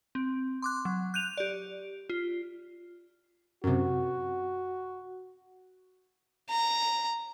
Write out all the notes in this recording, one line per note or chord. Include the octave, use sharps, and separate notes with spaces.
C4
C6 D6 F#6
F#3
F#6 G6 D#7 F7
G4 D5
F4
F#2 C3 F#4
A#5